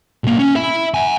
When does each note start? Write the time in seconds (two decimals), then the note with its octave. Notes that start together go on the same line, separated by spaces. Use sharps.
0.24 B1 A#3
0.39 C#4
0.56 E5 B5
0.94 F#5 G#5